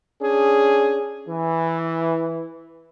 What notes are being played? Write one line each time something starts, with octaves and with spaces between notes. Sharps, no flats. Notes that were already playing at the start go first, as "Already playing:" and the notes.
C#4 D4 G#4
E3